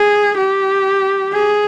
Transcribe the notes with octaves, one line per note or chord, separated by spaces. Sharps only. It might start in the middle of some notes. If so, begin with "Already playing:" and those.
Already playing: G#4
G4
G#4